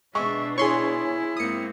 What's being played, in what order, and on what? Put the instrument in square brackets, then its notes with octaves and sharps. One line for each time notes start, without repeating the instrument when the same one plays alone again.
[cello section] B2 B3 D4 [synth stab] G#3 [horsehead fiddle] E5 [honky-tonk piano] C#6
[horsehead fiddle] E4 [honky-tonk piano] G#4 C#5 [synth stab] C6 C#6
[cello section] G#2 A#3 C4 [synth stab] D#6 C#7